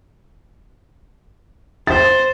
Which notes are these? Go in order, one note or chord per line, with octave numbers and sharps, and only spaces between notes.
C5 A6